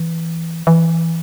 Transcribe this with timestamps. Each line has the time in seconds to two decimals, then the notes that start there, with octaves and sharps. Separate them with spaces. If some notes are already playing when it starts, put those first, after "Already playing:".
Already playing: E3
0.67 E3